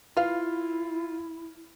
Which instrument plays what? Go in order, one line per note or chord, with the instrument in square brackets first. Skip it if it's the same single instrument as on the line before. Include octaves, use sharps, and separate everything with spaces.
[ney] E4 [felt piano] F4 [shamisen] B4 F5